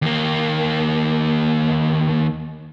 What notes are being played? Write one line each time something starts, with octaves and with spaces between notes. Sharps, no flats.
D#2 A#3